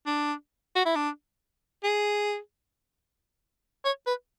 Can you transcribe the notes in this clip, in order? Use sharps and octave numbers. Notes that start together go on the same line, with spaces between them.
D4
F#4
E4
D4
G#4
C#5
B4